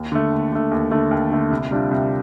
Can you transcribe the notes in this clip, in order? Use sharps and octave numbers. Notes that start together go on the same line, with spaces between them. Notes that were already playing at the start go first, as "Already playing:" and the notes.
Already playing: D#2
D3 A3
D#2
D3 A3
D#2
D3 A3
D#2
D3 A3
C2
C3 G3 D4 F4
C2